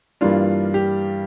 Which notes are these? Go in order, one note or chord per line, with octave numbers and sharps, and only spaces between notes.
G2 E3 G3 A#3 D4 F4
G4